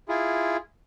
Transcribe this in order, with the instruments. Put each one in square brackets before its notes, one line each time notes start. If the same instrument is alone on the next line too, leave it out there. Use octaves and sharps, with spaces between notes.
[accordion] E4 F4 G#4